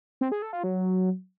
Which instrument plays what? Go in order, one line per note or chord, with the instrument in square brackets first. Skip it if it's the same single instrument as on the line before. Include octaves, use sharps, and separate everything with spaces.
[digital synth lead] C4
G#4
A4
F4
F#3